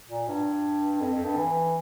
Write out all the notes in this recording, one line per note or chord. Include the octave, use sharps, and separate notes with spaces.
A#2
G2
F2
F2
G2
E3